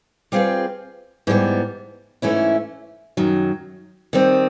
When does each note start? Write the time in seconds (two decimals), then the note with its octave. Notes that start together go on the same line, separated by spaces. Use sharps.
0.32 G3 C4 F4 G#4 B4
1.27 G#2 E3 G3 B3
2.22 G#2 E3 A3 C#4 E4
3.17 F#2 D#3 F#3
4.13 D#3 G3 C4